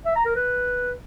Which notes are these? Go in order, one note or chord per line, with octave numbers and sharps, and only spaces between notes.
E5
A#5
A#4
B4